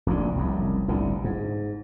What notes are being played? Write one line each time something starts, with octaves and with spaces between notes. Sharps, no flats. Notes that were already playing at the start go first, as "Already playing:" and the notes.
F1 A#1 F2 D3
F1 C2 F#2
G1 C2 A2 D3
G#2